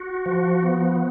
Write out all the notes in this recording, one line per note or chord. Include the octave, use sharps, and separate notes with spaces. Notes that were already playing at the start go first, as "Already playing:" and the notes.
Already playing: F#4
F3
B3